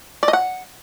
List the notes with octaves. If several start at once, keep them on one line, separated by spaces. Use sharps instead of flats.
D5
D#5
F#5